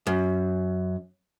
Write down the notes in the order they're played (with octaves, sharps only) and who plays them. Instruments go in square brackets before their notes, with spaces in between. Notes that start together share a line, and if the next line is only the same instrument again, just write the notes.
[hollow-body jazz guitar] F#2